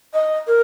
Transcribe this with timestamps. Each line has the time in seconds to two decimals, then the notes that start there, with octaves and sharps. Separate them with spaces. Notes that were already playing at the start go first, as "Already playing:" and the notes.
0.13 D#5
0.47 A#4